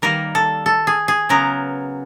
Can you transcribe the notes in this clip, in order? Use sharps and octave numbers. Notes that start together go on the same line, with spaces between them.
D#3 G3 A#3 A#4
A4
A4
G#4
G#4
C#3 F#3 B3 A#4